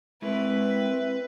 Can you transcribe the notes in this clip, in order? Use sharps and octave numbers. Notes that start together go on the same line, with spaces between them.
G#3 C4 E4 A#4 B4 E5